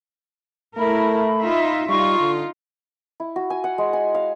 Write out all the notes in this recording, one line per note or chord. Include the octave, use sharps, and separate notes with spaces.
A3 E4 A#4 B5
D#4 F4 E5
G3 D#4 F4 C#6
D3
E4
F#4
G#5
F#5
G#3
G#5
F5